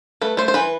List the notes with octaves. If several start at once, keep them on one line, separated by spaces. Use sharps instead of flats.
A3 B4
A3 C5
C5
E3 B4